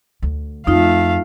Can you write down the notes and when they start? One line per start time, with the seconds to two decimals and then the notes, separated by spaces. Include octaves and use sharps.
0.22 D2
0.67 F2 A3 D#4 F4 F5